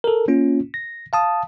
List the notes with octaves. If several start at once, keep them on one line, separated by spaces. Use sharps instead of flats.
A4 A#4
A#3 C#4 F4
A#6
F5 A5 D#6